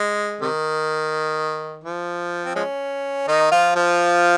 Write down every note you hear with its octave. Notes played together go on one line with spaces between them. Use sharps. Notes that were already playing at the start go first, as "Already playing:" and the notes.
Already playing: G#3
C3 D#3
F3
C4
F3 G#3 C#4
D#3 D#4
F3 F4
F3 F4